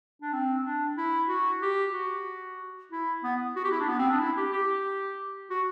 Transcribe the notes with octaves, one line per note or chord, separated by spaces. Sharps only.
D4
C4
D4
E4
F#4
G4
F#4
E4
B3
F#4
G4
E4
D4
B3
C4
D4
E4
G4
G4
F#4